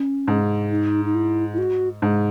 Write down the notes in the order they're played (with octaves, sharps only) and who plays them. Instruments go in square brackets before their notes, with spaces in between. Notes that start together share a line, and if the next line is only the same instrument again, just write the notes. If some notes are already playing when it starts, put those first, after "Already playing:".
Already playing: [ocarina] C#4
[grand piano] G#2
[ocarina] D#4
D#4
E4
E4
F#4
[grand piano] G#2